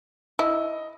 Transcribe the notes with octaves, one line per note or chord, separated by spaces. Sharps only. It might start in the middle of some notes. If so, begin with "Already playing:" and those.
E4 D#5